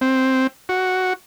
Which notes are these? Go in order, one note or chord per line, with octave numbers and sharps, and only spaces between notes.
C4
F#4